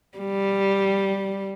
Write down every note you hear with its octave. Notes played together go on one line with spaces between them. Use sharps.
G3